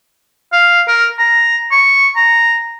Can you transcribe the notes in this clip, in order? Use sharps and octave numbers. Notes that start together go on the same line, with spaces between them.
F5
A#4
A#5
C#6
A#5